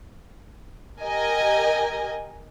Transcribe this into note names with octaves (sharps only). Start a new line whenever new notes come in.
G4 A#4 D#5 G#5